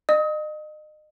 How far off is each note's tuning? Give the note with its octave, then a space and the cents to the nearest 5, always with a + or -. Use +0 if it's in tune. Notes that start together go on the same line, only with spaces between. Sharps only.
D#5 -35 D#6 +30